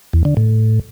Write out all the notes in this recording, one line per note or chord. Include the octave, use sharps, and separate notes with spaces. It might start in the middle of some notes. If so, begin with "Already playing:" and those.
E2
D3
A2